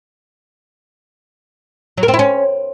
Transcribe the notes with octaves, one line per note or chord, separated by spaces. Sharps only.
F#3
A#4
C4
E4
C#4